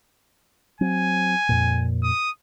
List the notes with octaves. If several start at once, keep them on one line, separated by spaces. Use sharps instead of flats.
F#3 C4 G#5
F2 A#2
D#6